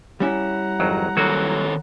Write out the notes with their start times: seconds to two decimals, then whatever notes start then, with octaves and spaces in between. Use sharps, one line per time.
0.20 G3 C#4 E4 F#5 A#5
0.80 G#1 F2 F#3
1.17 D#3 F#3 A#3 F#4 A4 C#5